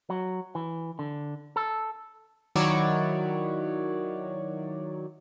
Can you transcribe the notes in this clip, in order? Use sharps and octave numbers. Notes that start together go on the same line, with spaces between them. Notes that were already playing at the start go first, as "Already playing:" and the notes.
F#3
E3
D3
A4
D#3 F#3 E4 F#4 C#5 D5